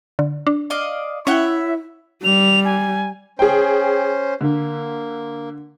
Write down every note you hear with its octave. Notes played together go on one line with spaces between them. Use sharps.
D3
D4
D5 D#5 F5
C#4 E4 C#5 E5 F#5 G5
G3 F7
G#5
C#4 G#4 C5 G5
D3 A#3